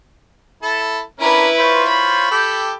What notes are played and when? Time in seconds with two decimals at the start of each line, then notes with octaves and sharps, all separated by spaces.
0.63 E4 A4
1.20 C#4 D4 E4 A#4 B4
1.59 F4 C5 C#5
1.88 B5
2.31 G4 A4 G5